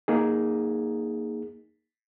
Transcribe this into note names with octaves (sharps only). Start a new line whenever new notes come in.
A#3 D#4 G#4